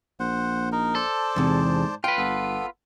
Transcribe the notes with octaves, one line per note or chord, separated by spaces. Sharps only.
A#1 C5 F#5
D#4 A#4
A4 C5 D5 A5
E2 G#2 C3
F4 B4 G5
G1 B3 A4